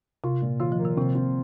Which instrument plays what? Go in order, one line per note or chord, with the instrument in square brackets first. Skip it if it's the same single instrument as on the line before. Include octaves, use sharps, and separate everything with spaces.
[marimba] C3 [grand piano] F4
[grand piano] A#2
[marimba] D#3 [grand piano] F4
[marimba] F3
[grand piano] A#3
[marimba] D#3
[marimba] C3 [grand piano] C4
[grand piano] C4